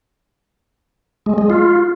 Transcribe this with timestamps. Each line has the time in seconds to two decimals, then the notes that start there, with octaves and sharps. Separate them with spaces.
1.26 G#3
1.38 G#3
1.50 F4